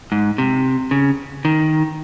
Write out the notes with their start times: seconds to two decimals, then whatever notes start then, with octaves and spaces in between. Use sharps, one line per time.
0.12 G#2
0.38 C3
0.91 C#3
1.45 D#3